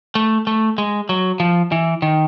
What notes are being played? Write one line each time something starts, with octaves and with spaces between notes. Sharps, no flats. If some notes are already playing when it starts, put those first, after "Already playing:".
A3
A3
G#3
F#3
F3
E3
D#3